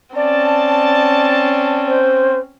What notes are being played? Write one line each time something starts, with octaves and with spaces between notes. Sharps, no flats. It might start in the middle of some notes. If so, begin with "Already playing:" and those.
C4 C#4 D5 A5
C5